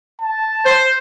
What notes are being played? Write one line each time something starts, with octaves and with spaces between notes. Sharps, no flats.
A5
C5